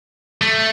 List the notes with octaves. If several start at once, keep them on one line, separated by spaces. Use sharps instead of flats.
A3